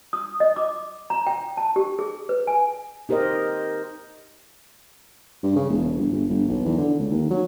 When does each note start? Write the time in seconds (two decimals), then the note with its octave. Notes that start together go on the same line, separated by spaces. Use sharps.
0.13 D#6
0.40 D#5
0.56 D6
1.10 A#5
1.27 G5
1.57 A5
1.76 G4
1.99 G#4
2.29 B4
2.47 G#5
3.09 D#4 G4 A#4 C5 D#5
5.43 G2
5.56 C#3
5.70 E1
5.97 G1
6.12 G1
6.29 G1
6.48 B1
6.65 E2
6.79 D3
7.00 C#2
7.11 D#2
7.31 F#3